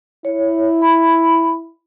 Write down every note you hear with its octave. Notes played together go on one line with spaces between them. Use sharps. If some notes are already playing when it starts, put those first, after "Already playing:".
E4 C#5
B5